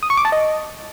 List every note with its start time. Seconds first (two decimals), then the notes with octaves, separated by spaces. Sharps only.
0.03 D#6
0.10 C#6
0.17 D6
0.25 A5
0.32 D#5